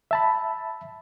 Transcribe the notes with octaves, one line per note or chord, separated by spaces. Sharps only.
E5 A5 B5